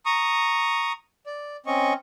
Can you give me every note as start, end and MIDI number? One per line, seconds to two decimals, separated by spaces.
0.06 0.92 82
0.06 0.92 85
0.06 0.92 87
1.26 1.57 74
1.66 1.93 60
1.66 1.93 61
1.66 1.93 75
1.66 1.93 85